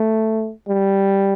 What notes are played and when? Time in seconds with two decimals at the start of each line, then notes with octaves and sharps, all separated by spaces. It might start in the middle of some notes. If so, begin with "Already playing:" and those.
Already playing: A3
0.68 G3